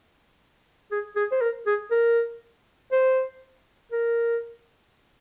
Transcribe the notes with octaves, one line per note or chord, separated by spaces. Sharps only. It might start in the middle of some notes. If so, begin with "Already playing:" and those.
G#4
G#4
C5
A#4
G#4
A#4
C5
A#4